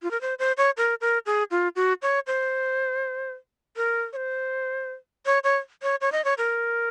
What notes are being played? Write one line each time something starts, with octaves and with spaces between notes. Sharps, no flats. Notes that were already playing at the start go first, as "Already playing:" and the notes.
F4
A#4
C5
C5
C#5
A#4
A#4
G#4
F4
F#4
C#5
C5
A#4
C#5
C5
C#5
C#5
C#5
C#5
D#5
C#5
A#4